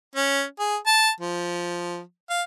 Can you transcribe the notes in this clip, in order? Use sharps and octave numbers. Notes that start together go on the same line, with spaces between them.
C#4
G#4
A5
F3
F5